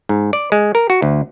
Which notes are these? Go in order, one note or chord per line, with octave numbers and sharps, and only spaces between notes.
G#2
D5
G#3
A#4
F#4
D2